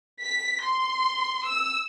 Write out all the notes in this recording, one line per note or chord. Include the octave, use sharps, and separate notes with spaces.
B6
C6
E6